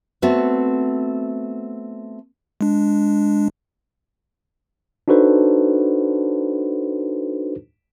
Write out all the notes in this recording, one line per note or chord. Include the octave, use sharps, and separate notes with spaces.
A3 B3 C4 F#4
G#3 D4
D4 D#4 F#4 A4 B4 C5